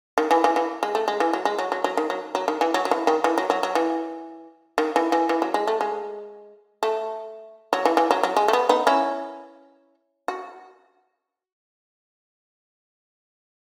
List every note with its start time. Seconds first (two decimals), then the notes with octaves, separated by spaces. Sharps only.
0.18 D#3
0.31 E3
0.44 E3
0.56 E3
0.83 G#3
0.95 A3
1.08 G#3
1.20 E3
1.33 F#3
1.45 G#3
1.58 F#3
1.72 F#3
1.84 F#3
1.97 D#3
2.10 F#3
2.35 F#3
2.48 D#3
2.61 E3
2.74 F#3
2.85 F#3
2.91 E3
3.07 D#3
3.24 E3
3.38 F#3
3.50 F#3
3.63 F#3
3.75 E3
4.78 D#3
4.96 E3
5.12 E3
5.29 E3
5.42 F#3
5.54 G#3
5.67 A3
5.81 G#3
6.83 A3
7.73 F#3
7.85 E3
7.97 E3
8.11 F#3
8.23 F#3
8.37 G#3
8.48 A3
8.53 B3
8.69 B3 D#4
8.87 C#4 E4
10.28 F#4